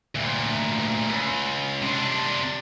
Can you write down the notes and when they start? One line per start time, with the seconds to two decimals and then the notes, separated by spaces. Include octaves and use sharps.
0.15 D2 A#2
1.10 C#2
1.82 C3 D4